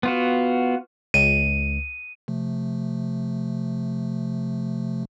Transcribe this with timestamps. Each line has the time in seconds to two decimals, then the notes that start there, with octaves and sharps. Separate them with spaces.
0.03 B3 F4 F#4
1.14 C#2 D#7
2.28 C3 F3 A3